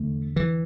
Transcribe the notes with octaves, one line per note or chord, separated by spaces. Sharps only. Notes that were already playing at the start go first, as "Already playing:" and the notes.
Already playing: E2 D3 A3
E3